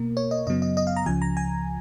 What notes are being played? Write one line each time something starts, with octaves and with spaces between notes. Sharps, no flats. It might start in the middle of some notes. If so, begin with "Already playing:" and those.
Already playing: B2 A#3 A#4
C#5
D#5
F#2 C#3 F#3 B3 D#5
D#5
D#5
F5
A#5
C#2 C#3 F3 G#5
A#5
G#5